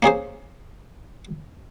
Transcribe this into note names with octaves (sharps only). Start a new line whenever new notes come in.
A#3 C#4 G#4 C5